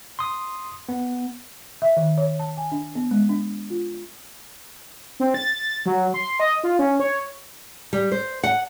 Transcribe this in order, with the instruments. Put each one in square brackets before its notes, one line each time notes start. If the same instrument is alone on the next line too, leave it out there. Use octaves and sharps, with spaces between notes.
[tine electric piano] C6 D#6
B3
[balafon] E5
D#3
C#5
A5
G#5
D4
B3
G#3
D4
F4
[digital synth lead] C4
A6
A6
F#3
C6
D#5
F4
C#4
C#5
[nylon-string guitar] G3
C5
F#5